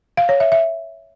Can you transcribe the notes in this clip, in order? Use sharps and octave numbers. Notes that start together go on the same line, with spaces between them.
F5
C#5
E5
E5